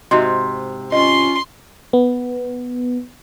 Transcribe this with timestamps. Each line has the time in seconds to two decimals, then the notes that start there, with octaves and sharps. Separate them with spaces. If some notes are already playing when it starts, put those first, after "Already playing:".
0.11 G#2 C3 F#4 D#5 C6
0.92 C#4 F4 D#5 C6
1.93 B3